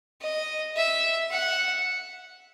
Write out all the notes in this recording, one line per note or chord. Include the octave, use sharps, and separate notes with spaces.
D#5
E5
F#5